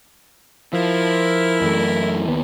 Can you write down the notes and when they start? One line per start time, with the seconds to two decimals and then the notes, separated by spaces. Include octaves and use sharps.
0.73 F3 E4 A#4
1.61 F#2 E3 A3
2.28 D#2 B3